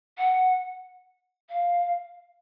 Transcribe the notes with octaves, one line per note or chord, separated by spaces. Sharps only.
F#5
F5